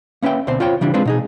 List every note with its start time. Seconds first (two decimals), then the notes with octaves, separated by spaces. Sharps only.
0.22 A#3 C#4 B4 E5 G5
0.47 D2 B2 C4 C5
0.60 F4 C5 C#5 G5
0.81 C#3 E3 G3 D4
0.94 G#3 C4 D4 F4 B4 C5
1.05 B2 D#4 G#4